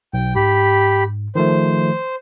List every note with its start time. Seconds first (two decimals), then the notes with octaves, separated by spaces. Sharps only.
0.14 B1 G5
0.36 G#2 G4 B5
1.35 D#3 F3 A3 C5